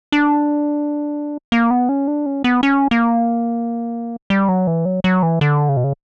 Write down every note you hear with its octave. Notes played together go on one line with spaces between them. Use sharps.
D4
A#3
B3
C#4
D4
C#4
B3
C#4
A#3
G3
F#3
E3
F#3
F#3
E3
D3
C#3
B2
C#3